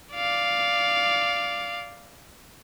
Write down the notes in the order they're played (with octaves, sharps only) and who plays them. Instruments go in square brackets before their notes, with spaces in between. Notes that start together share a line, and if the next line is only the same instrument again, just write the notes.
[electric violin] D5 F5